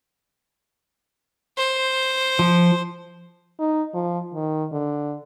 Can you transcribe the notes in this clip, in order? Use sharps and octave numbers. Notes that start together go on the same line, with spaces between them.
C5
F3
D#4
F3
D#3
D3